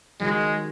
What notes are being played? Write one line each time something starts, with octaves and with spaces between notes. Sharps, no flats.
D#3 F#3 G#3